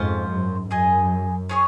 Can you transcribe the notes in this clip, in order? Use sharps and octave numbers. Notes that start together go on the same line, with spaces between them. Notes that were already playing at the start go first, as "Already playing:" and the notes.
Already playing: F2 G#2 C#4 F4 C5
F#2
F#2 G#4 D#5 G#5
C#4 G#4 C#5